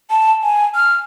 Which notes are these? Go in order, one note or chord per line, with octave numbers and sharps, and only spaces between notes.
A5
G#5
F6